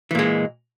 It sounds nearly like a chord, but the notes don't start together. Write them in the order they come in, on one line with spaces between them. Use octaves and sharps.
E3 A#2 G#3